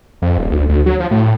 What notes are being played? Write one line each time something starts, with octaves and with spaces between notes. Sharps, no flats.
F2
D#1
D2
D2
F#3
F3
A2